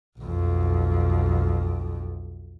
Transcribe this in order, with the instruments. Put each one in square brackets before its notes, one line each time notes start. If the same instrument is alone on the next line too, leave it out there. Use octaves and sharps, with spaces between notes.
[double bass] B1 F2